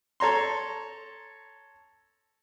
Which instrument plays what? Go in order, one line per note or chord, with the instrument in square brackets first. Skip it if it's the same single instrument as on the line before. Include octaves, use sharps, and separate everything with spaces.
[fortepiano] A4 C#5 A#5 C6